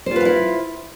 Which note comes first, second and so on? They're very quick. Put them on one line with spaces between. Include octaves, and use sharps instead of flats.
C5 F4 B4 F5 E4